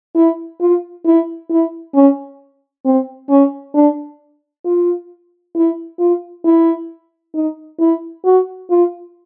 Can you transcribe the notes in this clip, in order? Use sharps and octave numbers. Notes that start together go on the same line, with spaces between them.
E4
F4
E4
E4
C#4
C4
C#4
D4
F4
E4
F4
E4
D#4
E4
F#4
F4